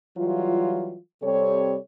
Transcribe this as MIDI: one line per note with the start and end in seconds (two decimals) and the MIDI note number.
0.17 0.97 52
0.17 0.97 54
0.17 0.97 55
0.17 0.97 65
1.23 1.76 48
1.23 1.76 55
1.23 1.76 60
1.23 1.76 69
1.23 1.76 73